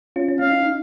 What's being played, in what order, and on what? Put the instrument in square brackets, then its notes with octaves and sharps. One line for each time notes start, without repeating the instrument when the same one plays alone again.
[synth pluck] C#4 F4
C#4
[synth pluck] C#4 [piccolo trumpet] F5
[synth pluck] D#4
D#4